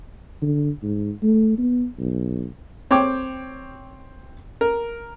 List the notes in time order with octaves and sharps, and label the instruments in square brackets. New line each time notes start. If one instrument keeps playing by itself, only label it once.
[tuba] D3
G#2
A3
B3
B1
[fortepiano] C4 C#5 G5 D6
A#4